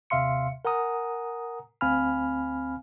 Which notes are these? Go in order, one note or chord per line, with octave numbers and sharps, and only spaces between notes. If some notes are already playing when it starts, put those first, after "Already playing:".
D#2 C3 E5 F5 C6 C#7
A#4 F#5 G#5 A#5 D#6
D2 C4 F5 G#5 B5 F6